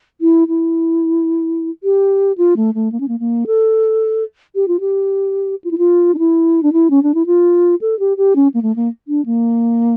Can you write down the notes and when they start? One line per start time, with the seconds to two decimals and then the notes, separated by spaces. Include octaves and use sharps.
0.21 E4
0.48 E4
1.83 G4
2.38 F4
2.57 A3
2.74 A3
2.92 A#3
3.00 C#4
3.08 A#3
3.20 A#3
3.47 A4
4.55 G4
4.68 F4
4.80 G4
5.64 F4
5.71 E4
5.78 F4
6.14 D4
6.19 E4
6.63 D4
6.73 E4
6.90 C#4
7.03 D4
7.14 E4
7.26 F4
7.81 A4
7.99 G4
8.17 G4
8.36 C#4
8.54 A#3
8.62 A3
8.76 A#3
9.08 D4
9.26 A#3